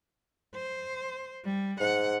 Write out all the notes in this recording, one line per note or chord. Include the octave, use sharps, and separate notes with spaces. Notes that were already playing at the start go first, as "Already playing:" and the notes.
C5
G3
G#2 F#5